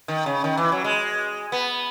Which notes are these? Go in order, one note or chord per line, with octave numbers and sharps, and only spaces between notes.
D#3
C#3
D#3
E3
F#3
G#3
B3